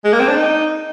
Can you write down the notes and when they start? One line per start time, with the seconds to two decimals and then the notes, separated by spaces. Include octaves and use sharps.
0.05 G#3
0.13 A#3
0.20 C4
0.28 D4
0.36 D#4